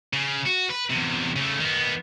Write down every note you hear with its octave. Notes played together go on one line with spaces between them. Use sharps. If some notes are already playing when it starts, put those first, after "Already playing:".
C#3
F#4
B4
E2 C3
C#3 A3
D#3 B3